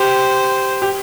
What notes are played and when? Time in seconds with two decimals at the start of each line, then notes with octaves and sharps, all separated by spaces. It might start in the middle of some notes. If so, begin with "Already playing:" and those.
Already playing: G4 C5
0.82 G4